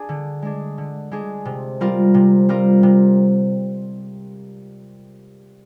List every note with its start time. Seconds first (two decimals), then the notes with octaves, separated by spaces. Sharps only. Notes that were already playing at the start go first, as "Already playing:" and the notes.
Already playing: D4 G#4
0.09 D3
0.42 G#3 D4 G#4
0.78 D3
1.11 G#3 D4 G#4
1.45 C3
1.81 G3 C4 F4 A#4
2.14 C3
2.49 G3 C4 F4 A#4
2.83 C3